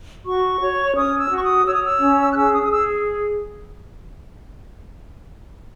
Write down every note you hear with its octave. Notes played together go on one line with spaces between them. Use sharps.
F#4 C#6
C#5
C#4 D#6
E6
F#4 C#6
D#6
C#5 E6
D#6
E6
C#4
F#6
G#4 E6
D#6
D#6
G#4 E6